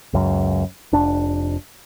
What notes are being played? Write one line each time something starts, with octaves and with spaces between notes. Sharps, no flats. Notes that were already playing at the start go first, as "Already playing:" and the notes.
C#2 F#2
F1 D4